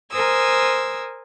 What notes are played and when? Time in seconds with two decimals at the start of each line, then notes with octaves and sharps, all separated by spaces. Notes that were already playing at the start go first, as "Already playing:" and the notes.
0.12 A#4 C5 G#5 D#6 E6